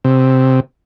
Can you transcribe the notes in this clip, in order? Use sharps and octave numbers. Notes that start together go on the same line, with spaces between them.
C3